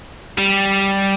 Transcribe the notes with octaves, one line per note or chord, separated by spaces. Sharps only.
G3